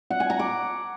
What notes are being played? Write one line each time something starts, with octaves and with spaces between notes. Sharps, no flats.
F#5
G#5
A#5
D6